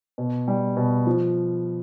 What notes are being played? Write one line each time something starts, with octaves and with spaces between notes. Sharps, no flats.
B2
G3
B2
F3